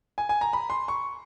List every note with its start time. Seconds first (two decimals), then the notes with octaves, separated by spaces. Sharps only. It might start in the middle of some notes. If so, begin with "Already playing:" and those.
0.18 G#5
0.29 G#5
0.41 A#5
0.53 B5
0.70 C6
0.88 C#6